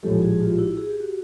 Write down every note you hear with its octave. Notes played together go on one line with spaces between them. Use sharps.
A#1 A2 F3 G#3 G4 A4
F#4 G#4
F4 G4
E4 F#4
G#4
G4
F#4